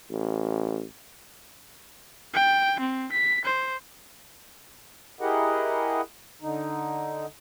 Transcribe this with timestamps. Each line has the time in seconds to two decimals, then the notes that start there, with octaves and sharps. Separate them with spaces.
0.10 A1
2.34 G5
2.80 C4
3.12 B6
3.45 C5
5.21 E4 G4 G#4 A#4 D#5 F#5
6.42 D3 D#4